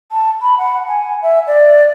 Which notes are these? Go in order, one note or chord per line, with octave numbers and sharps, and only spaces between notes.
A5
B5
F#5
G#5
E5
D5